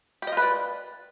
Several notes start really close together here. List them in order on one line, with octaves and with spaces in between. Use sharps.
G4 D#5 F4 B4 D5